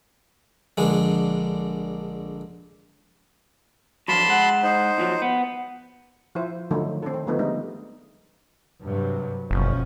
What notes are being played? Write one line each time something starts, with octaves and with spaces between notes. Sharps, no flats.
A#1 D3 G#3
D3 F3 F#3 A5 B5 C6
G#3 F#5
D#4 C5
D#2 F3 F#3
B3
F3 E4 C5
D3 D#3 F3 F#3 A3 D#4
C4 D4 A4
D#3
D3 F3 A3 B3 C4 D#4
G3 G#3 D4 D#4
G2 C3 F#3
F#1 B2 F3 C#4